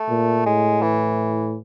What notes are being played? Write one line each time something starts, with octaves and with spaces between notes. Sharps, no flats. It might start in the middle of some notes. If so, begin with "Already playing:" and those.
Already playing: A3
A#2
A2 G#3
E3